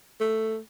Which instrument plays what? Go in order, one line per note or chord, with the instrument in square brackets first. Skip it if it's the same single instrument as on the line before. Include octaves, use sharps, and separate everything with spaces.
[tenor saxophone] A3